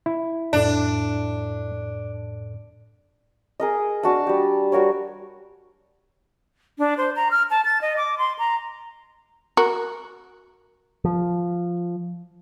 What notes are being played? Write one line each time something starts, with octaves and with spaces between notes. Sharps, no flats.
E4
F2 A2 D4 A4
G#4 A#4 D#5
D4 F#4 A5
G3 G4
G3 F#4 A#4 C#5
D4
C5
A#5
F6
A5
A6
D#5
D6
C6
A#5
F#4 A#4
F3